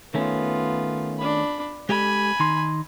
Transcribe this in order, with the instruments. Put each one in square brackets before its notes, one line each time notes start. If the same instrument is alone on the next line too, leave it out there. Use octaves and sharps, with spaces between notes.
[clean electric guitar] D#3 A3 C#4 [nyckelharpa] B3 F4
[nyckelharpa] D4 B5
[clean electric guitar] G#3 G4 A4 [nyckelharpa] G#5 B5
[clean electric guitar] D#3 D#4 C6